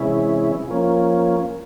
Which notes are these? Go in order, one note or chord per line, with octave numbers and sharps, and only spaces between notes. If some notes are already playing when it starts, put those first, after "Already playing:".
Already playing: C3 E3 G#3 C#4 E4
F3 A#3 C#4